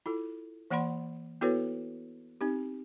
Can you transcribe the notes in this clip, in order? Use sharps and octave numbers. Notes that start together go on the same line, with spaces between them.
E4 F4 A4
E3 A#3 D5 F#5 B5 C6
B3 E4 F#4 A4 B4 C#5
C4 D#4 G4